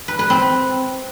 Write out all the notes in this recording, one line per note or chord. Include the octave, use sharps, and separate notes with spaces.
B4
B4
C4